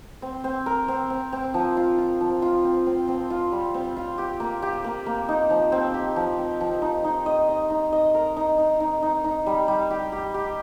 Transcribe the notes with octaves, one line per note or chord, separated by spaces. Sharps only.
C4
C4
A#4
C4
C4
C4
F3
F4
F4
F3
F4
C4
C4
C4
F4
G3
C4
F4
G4
A#3
G4
A#3
A#3
D#4
F3
C4
G4
F3
C4
F3
D#4
D#4
D#5
D#5
D#4
D#5
A#4
D#4
D#4
D#4
D#4
D#4
G3
G3
G4
G4
G4